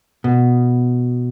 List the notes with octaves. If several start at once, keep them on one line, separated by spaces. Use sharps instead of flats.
B2